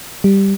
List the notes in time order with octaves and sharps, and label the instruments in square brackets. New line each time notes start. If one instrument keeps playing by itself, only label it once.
[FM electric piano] G3